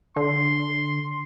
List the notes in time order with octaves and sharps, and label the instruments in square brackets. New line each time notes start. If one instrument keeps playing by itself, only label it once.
[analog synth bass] D3 [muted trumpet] C6